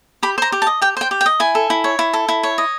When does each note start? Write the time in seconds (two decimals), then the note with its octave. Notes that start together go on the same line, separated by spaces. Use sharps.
0.23 G4 B5
0.38 C5 A#5
0.52 G4
0.62 A5
0.67 D#5
0.81 G4 G5
0.97 C5 G5
1.11 G4
1.21 G5
1.26 D#5
1.40 E4 G#5
1.55 A4
1.70 E4
1.84 C#5
1.99 E4
2.13 A4
2.29 E4
2.43 C#5
2.58 D#5